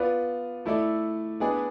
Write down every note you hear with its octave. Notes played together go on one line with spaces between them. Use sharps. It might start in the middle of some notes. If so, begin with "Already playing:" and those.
Already playing: B3 F4 B4 D5
A3 E4 A4 D5
B3 D4 G#4 D5